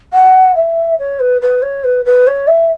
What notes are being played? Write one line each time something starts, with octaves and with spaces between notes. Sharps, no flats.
F#5
E5
C#5
B4
B4
C#5
B4
B4
C#5
E5